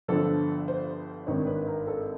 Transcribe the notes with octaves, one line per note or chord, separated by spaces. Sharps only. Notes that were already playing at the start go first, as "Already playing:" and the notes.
G1 G2 D3 F3 A4
C5
G#1 G2 D#3 C#5
B4
A#4
A4